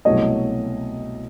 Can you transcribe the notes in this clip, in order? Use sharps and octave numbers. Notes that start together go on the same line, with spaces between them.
C2 B2 F#3 A3 C#5 D#5